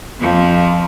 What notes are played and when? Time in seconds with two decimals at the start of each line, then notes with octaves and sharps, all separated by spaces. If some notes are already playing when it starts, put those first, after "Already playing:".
0.20 F2 F3